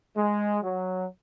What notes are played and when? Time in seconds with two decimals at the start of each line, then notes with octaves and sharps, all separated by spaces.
0.16 G#3
0.63 F#3